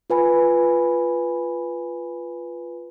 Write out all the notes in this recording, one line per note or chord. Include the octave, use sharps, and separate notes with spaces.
F4 B4 G#5 B5